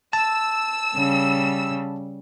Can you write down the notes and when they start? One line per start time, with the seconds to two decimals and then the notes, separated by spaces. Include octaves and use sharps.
0.13 A5 E6
0.95 C#3 G3